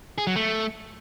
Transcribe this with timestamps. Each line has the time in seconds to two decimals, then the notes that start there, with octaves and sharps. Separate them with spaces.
0.18 G#4
0.27 F#3
0.36 A3